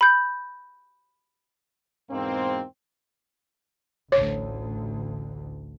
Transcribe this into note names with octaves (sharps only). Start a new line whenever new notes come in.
B5 G6
E2 G#2 B2 A#3 C4
A1 D2 C#5